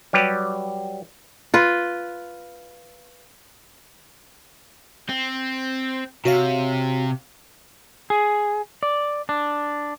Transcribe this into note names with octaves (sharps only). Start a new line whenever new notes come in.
F#3 G3 G4 B4
F4 B4
C4
C3 F#4 C#5 F5
G#4
D5
D4